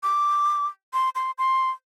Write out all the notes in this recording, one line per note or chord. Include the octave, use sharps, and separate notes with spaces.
D6
C6
C6
C6